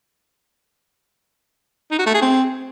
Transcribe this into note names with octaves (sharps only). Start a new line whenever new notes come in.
D#4
F#4
A3
G#4
C4